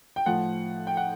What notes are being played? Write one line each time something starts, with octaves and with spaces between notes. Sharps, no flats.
G5
A2 F3 F#5
G5
F#5